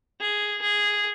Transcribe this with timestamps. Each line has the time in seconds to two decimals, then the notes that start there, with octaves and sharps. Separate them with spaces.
0.20 G#4
0.61 G#4